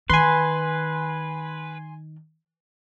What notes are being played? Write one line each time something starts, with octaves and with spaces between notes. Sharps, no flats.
D#3 B4 G#5 C6